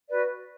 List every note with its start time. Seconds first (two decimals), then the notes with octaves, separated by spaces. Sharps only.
0.10 F#4 B4 D5